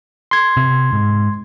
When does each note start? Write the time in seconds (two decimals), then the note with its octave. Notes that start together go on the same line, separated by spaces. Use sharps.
0.31 C6 G#6
0.57 C3
0.93 G#2